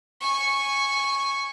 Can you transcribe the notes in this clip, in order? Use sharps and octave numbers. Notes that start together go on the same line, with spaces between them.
G#5 C#6